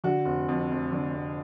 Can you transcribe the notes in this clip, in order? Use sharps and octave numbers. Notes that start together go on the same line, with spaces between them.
D3 F#4
F1
F2
F1
D3
F1